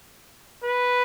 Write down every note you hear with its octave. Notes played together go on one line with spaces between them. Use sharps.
B4